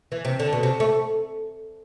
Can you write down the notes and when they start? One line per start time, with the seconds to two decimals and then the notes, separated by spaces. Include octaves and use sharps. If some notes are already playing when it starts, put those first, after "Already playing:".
0.12 E3
0.25 C3
0.40 D3
0.53 B2
0.63 C3
0.80 A3